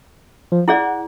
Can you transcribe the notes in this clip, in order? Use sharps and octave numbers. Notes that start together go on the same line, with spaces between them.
F3
E4 G#4 D5 F#5